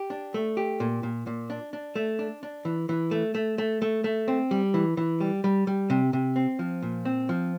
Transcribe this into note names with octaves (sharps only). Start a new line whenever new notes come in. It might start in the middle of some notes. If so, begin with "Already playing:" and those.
Already playing: G4
D4
A3
G4
A#2
A#2
A#2
D4
D4
A3
D4
D4
E3
E3
A3
A3
A3
A3
A3
C4
G3
E3
E3
G3
G3
G3
C3
C3
C4
F3
A#2
C4
F3